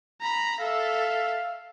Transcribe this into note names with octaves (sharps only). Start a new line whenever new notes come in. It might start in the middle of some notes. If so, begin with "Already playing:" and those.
A#5 B5
A4 E5 F5